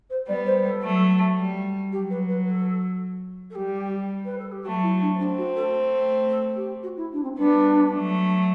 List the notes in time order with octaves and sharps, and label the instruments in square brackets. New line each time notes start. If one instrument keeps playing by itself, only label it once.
[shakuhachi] C5
[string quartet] G3 B3 [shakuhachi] D5
[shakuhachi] C5
A4
[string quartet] F#3 A3
G3
[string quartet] F#3 [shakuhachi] G4
[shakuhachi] B4
B4
A4
A4
[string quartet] G3 [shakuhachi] G4
[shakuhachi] B4
A4
G4
[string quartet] F#3 A3 [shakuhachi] F#4
[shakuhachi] E4
D4
[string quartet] A3 C4 [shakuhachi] D4
[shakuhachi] F#4
A4
A4
G4
F#4
E4
D4
C4
[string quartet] G3 B3 [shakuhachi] D4
[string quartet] F#3 A3